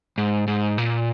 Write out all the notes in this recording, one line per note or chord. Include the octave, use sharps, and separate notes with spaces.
G#2
G#2
A#2